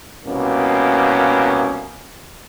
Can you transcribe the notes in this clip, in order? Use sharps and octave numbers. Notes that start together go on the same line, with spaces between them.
C2 B2 A#3 C#4